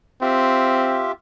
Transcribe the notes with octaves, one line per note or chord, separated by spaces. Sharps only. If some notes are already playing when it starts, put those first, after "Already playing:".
C4 F4 G4 E5